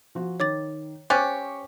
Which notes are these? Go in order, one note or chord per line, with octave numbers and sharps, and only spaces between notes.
F3 F#4
D#3 C#5 D6 A6
C#4 G4 C5 C#6 D6 F#6 A6